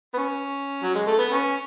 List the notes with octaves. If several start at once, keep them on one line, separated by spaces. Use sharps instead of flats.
B3
C#4
F#3
G#3
A3
B3
C#4